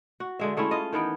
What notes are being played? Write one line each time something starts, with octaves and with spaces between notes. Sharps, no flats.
F#4
D3 G#3 E5
G#3 A3 C#4 E4
F4 D#5
D#3 E3 B3 G5